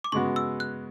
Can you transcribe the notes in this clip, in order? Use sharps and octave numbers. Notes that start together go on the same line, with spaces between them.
D6
C#3 G#3 B3 F#4 C#6
E6
F#6